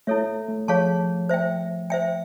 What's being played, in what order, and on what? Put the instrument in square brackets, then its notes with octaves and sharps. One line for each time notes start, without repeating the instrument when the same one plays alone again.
[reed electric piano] A3 [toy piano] E4 A4 C#5 E5
[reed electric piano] A3
[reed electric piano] F3 [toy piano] G#4 C#5 F5 A5 C#6
[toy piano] C5 E5 G5
C5 E5 G5